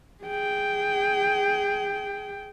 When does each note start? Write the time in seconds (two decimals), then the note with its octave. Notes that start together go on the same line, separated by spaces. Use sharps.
0.23 G#4 G5